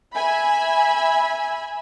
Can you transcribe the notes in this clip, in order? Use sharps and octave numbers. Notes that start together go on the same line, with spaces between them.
E5 G#5 B5